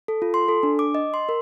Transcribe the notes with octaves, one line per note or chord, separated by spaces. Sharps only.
A4
F4
C6
A4
D4
D6
D#5
C6
A#4